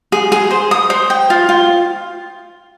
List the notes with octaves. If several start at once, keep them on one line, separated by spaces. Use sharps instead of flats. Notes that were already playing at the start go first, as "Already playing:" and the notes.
G#4
G#4
C5
D#6
C5
G5
F4
F4